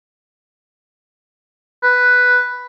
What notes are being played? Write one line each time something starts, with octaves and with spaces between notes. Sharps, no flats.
B4